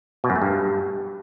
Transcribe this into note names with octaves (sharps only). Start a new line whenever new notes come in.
B2
F#2
A3
G2